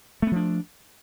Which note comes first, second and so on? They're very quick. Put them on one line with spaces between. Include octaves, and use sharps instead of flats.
A3 B3 F3 D4